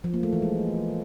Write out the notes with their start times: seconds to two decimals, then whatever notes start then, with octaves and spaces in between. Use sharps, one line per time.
0.04 F3
0.14 A#3
0.23 A3
0.33 E3
0.42 G#3